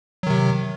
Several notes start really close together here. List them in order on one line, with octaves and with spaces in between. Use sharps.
F#3 D#3 C3